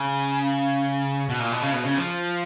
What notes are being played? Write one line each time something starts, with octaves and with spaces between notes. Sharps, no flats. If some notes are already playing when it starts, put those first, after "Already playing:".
Already playing: C#3
B2
A#2
B2
C#3
B2
C#3
F3